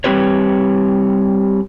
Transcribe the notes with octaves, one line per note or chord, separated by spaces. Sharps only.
G3 G#3 C4 G4 B4 C#5